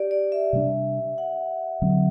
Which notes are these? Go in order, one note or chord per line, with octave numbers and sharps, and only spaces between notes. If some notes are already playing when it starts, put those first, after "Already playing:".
Already playing: G4 D5
D5
E5
C3 G3 B3 D4
F#5
D3 F#3 C4